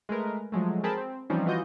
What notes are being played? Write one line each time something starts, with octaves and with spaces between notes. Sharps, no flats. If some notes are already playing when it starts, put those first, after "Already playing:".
G#3 A3 A#4 B4
F3 F#3 G#3 A3
C4 G#4 A#4 G5 A5 B5
C4
E3 F3 G3 C4 C#4 D#4
E3 F4 F#4 D#5 G6